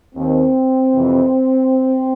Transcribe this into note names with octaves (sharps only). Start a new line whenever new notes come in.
D#2 D#3 C4
F2 C3 E3